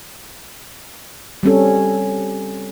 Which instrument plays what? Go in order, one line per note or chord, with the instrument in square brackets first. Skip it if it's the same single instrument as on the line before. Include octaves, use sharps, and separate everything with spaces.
[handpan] G3 C4 C#4 A4